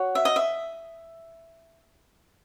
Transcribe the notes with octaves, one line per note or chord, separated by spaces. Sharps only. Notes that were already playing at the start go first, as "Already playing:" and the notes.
Already playing: F#4 C#5
E5
D#5
E5